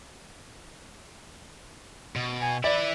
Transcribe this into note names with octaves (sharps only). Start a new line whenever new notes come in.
B2
G#5
E4 B4 D5 E5